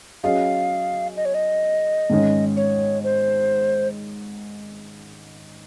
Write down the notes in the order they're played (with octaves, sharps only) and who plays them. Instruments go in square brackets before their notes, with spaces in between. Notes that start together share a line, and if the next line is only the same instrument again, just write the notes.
[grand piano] F#3 C#4 G#4 D#5 [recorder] F5
[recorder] D#5
C#5
D#5
[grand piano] G#2 D#3 G#3 C#4 G#4
[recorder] C#5
C5